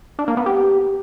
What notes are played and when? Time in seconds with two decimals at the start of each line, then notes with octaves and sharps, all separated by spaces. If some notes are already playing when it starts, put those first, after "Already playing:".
0.19 D4
0.28 A#3
0.37 B3
0.46 G4